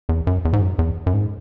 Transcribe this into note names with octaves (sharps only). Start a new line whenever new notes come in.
E2
F#2
E2
G#2
F#2
E2
F#2
G#2